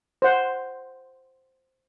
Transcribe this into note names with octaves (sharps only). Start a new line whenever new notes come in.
C5 F#5